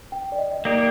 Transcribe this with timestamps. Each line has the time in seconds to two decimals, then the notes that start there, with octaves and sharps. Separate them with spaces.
0.12 G5
0.32 D5
0.38 D#5
0.53 D#5
0.65 A#3 D#4 G4 D5